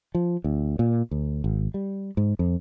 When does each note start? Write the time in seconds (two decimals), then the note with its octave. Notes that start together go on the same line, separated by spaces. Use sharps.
0.15 F3
0.44 D2
0.79 A#2
1.11 D2
1.44 G#1
1.74 G3
2.17 G#2
2.39 F2